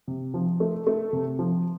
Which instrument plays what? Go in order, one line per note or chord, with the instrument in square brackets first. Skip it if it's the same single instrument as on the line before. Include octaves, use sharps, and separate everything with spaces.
[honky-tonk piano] C3
F3
A3
A3
C3
F3